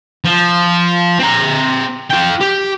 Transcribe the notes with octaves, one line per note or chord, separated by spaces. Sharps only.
F3
C4 A#5
F4 G5
G4